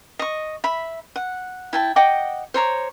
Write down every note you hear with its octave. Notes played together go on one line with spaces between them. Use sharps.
D#5 C#6
E5 B5
F#5
E4 G5 A5
D#5 F#5 G5 D6
C5 C#5 A#5 D6